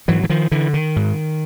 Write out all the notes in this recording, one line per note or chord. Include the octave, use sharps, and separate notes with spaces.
G#2 E3 F#3
E3
D#3 F3
D3 E3
D#3
G#2